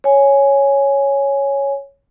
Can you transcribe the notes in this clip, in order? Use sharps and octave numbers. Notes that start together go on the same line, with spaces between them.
C#5 G#5